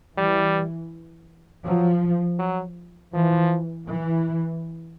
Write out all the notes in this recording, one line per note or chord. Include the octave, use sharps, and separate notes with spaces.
E3 G3
F3 F#3
F#3
E3 F3
E3